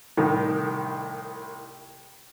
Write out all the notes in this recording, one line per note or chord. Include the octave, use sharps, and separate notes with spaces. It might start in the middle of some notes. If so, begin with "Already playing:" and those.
C2 A2 D#3